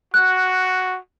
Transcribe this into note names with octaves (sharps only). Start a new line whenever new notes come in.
F#4 F#6